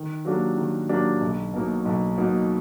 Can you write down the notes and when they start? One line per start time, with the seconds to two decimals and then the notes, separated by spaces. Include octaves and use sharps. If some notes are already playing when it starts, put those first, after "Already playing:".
Already playing: D#3
0.25 F#3 A#3 D4 G4
0.58 D#3
0.89 F#3 A#3 D4 G4
1.21 B1
1.53 B2 F#3 A#3 D#4
1.85 B1
2.17 B2 F#3 A#3 D#4